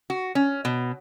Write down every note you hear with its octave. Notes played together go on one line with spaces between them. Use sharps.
F#4
C#4
B2